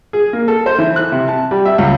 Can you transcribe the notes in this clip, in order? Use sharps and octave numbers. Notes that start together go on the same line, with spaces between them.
G#4
A#3
A4
C5
E3
F#6
C3
A5
G3
E5
C#2